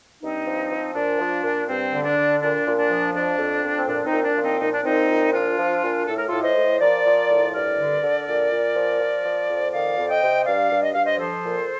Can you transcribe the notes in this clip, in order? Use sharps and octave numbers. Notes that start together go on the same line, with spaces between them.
G2 C4 D#4
F3
F3
A#2 D4
F3
A#2
G2 C4
D3
D4
D3
A#2 D4
A#2
D4
F3
F2 D4
F2
F2
C4
A#2 D4
C4 D#4
A#2
D4
F3
C4 D#4
A#2 D#4
D4
A#2 C4 D#4
A#2
F3 D4 F4
F3
A#2
A2 A4
A#4
A2 F4 A4
C5 D#5
A2
F3 A#4 D5
F3
A2
G2 A#4 D5
D3
D3
A#2
A#2
F3
F3
F3
F2
D#3 D5 F5
F2
D#5 G5
C3
G2 D5 F5
G2
D#5
G2 F5
C5 D#5
F3 A4 C5
A#2